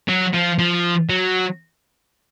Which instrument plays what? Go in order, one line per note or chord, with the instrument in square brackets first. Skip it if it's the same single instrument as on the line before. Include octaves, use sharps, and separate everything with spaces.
[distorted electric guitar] F#3
F3
F3
F#3